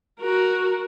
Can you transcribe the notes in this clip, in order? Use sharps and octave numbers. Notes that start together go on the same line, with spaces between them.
F#4 A#4